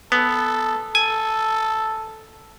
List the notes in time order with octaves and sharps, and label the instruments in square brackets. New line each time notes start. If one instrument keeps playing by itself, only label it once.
[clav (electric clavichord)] B3 [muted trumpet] A4
[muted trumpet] A4 [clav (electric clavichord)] G#5